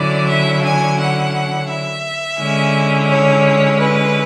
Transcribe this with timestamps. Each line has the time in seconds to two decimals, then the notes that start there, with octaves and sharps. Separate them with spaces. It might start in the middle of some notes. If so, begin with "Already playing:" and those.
Already playing: D3 F#3 C#4 E4 D5
0.28 E5
0.62 G#5
0.98 F#5
1.69 E5
2.39 D3 G#3 C#4 E4
3.09 C#5
3.79 B4